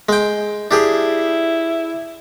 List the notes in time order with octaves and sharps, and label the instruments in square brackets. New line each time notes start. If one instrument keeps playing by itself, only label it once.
[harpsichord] G#3 G5
[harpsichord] D4 G4 G#4 [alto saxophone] E4